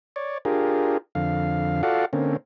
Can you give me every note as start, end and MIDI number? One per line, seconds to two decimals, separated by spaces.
0.16 0.38 73
0.16 0.38 74
0.45 0.97 62
0.45 0.97 65
0.45 0.97 67
0.45 0.97 68
0.45 0.97 70
1.15 1.82 41
1.15 1.82 50
1.15 1.82 77
1.83 2.05 65
1.83 2.05 66
1.83 2.05 69
1.83 2.05 74
1.83 2.05 77
1.83 2.05 78
2.13 2.37 50
2.13 2.37 58
2.13 2.37 60
2.13 2.37 61